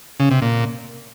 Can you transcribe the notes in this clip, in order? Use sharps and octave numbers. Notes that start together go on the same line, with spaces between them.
C#3
C3
A#2